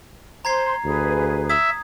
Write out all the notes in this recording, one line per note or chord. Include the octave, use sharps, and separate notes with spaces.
C5 A#5 C6 G#6 C7
D2 G#4 B4
E5 D#6 G#6